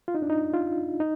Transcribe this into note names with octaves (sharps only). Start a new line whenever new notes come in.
F4
D#4
D4
D#4
F4
D#4